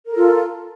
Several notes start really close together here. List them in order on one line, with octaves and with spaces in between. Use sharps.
A#4 A4 F4